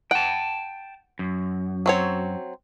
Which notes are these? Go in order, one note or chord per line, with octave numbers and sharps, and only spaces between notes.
F#5 G5 A5
F#2
F#3 C4 C#5